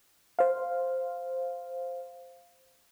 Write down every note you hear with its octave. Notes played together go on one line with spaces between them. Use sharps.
C5 F5